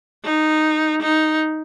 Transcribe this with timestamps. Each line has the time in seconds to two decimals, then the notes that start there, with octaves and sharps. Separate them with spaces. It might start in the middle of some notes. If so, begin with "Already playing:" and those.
0.25 D#4
1.02 D#4